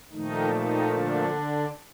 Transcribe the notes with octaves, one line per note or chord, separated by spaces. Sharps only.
A#2 D#3 F3 A3 D#4
D#3 D#4
D3 D4